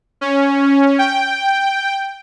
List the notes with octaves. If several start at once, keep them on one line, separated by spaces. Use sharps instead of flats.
C#4
G5